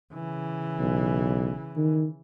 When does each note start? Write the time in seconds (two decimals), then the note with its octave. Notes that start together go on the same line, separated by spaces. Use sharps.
0.13 C#3 E3
0.79 B1
1.77 D#3